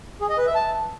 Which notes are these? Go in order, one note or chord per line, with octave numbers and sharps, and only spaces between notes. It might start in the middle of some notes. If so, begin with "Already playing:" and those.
G#4
D#5
B4
E5
A5